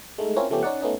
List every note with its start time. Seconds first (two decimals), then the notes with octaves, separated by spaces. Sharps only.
0.18 G#3 A3 D#4
0.36 C4 C#4 E4 F4 A#4 C#5
0.50 C#3 F3 A3 B3 C#4 G4
0.63 C#4 D#4 D5 F#5
0.82 A3 B3 C#4 D#4